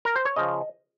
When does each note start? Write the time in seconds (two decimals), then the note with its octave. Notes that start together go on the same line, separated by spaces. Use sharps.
0.05 A#4
0.16 C5
0.25 C#5
0.36 C#3 F3 D#5